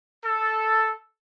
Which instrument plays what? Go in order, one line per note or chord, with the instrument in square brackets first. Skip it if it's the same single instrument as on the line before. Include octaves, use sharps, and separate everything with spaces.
[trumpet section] A4